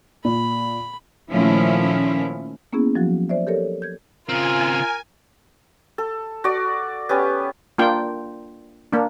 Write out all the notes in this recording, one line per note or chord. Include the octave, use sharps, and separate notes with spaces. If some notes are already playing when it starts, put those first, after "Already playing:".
A#2 B5
A#2 D#3 F3 A3 C#4 E4
A#3 B3 C#4 E4 G#4
F3 F#3 F#4
C5 D5 E5
G4 A4 A#4 C#5
G6 G#6
C#3 C4 F4 A#4 G#5
A4
F#4 D5
B3 C#4 G4
A#3 D4 F4 G5
A#3 D4